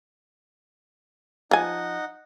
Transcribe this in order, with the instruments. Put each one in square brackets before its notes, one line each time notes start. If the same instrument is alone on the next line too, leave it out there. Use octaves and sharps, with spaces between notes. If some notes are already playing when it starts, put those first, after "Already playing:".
[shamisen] F3 G#5 [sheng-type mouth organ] D#4 F#5